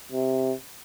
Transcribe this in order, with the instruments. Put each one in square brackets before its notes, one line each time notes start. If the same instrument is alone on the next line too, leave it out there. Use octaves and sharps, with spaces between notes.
[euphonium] C3